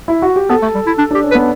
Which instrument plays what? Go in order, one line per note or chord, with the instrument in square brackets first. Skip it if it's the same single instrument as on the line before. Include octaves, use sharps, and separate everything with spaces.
[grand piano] E4
F#4
G4
[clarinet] B3 [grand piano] A4
[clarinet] A3
G3
E4
D4
[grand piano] D4 [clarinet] G4
[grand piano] C#4
[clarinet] B4
[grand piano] B3